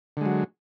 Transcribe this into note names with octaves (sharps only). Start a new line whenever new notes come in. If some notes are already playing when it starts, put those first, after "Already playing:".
D3 F#3 G#3